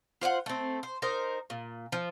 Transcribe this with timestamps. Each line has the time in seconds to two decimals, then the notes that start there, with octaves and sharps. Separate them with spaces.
0.21 F4 C5 D#5 F#5
0.46 A3 C4
0.83 C5
1.02 D#4 A#4 C5
1.50 A#2
1.92 F3